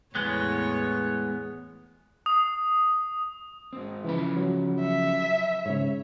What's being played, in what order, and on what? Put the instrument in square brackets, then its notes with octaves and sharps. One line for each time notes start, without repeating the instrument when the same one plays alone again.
[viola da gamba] E2 A2 C#5 [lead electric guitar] G#3 B3
[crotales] D#6
[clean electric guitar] G#2 C4
[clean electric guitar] C#3 F3 B5 [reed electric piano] E3
[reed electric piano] F#3
[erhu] E5
[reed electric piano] G#2 C#3 [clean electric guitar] C#5